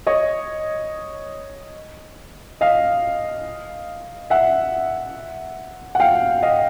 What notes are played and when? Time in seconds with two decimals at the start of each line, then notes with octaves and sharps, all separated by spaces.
0.07 C#5 D#5
2.61 D#5 F5
4.30 E5 F#5
5.95 F#5
6.00 F5 G5
6.43 D#5 F5